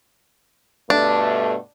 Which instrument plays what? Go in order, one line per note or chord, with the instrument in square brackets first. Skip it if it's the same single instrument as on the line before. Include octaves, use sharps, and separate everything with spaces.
[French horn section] G2 B2 A3 [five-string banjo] D4